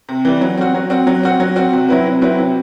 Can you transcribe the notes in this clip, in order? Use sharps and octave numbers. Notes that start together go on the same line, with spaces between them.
C3
E3 G3
F#3
C4 F#4
F#3
C4 F#4
F#3
C4 F#4
F#3
C4 F#4
C3
F#3 C4 E4 B4
C3
F#3 C4 E4 B4
C3